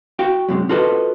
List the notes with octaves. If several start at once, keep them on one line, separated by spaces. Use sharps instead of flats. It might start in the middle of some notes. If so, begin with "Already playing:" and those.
F#4 F5 G5
F#2 C3 G#3
F4 F#4 A4 B4 D#5